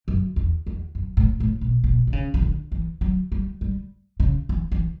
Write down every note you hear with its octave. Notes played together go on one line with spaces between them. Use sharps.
F#2
E2
E2
F#2
A2
A2
B2
B2
D3
C#3
E3
D3
E3
F#3
G3
G3
C#3
E3
E3